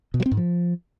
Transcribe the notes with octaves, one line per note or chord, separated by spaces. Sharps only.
B2
F#3
C4
G#2
F3